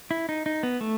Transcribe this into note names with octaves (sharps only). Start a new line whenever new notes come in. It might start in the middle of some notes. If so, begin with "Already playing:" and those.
E4
D#4
D#4
B3
A3